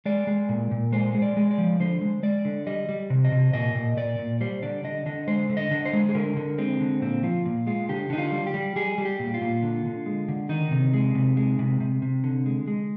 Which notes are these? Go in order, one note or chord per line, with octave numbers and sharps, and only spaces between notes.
G#3 D5
G#3
A#2
A#2
G#3 C5
G#3
D5
G#3
D5
F3
D3 C5
G#3
G#3 D5
D3
G3 D#5
G3
C3
D#5
C3
A#2 D#5
A#2
A#2 D5
A#2
G3 C5
D3 D5
D3 D#5
D3 D#5
G#3 C5
D3
D#5
D3
C5
G#3
G#4
D3 A#4
D3
G#3 C4
D3
A#2 C4
F3 F4
A#2
G#3 F4
D3 G4
D3 D#4
F4
G3
G4
G3
G3 G#4
G3
G4
A#2
F4
A#2
D3
D3
G#3
D3
D#3 D#4
C3
G#3
C3
G#3
C3
C3
C3
D3
G#3
G#3